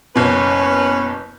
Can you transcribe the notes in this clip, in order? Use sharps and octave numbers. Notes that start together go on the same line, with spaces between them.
F#1 B2 C#4 B4